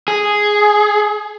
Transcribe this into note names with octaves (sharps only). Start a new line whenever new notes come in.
G#4